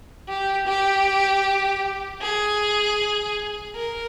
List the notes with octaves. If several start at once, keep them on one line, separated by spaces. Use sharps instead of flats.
G4
G4
G#4
A#4